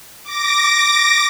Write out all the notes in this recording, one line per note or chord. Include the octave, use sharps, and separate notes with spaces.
D6 A#6